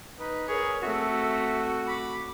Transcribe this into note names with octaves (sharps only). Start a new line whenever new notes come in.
D#4 B4
G#4 A#4 C#5
A3 C4 F#4 E5
B5 D6